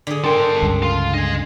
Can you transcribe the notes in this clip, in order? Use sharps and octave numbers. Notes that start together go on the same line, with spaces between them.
D3 G#4
D4 A4 A#4 G5 C6
C#2 G2 C#3
F4
D4 D#5 G#5